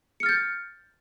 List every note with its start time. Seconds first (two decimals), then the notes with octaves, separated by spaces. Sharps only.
0.20 C#7
0.23 F6
0.26 A6
0.29 G6